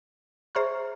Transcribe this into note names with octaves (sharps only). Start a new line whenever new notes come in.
G#4 C5 E5 A#5 C#6 F6